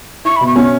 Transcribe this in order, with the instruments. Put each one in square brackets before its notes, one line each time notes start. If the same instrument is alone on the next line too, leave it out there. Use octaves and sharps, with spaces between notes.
[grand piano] E4 [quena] C#6
[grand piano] B2 [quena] B5
[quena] C#6
[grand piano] C#4